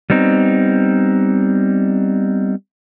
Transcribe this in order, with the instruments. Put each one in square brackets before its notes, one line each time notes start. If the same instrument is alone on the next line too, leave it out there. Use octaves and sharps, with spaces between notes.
[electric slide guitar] G3 B3 C4 D#4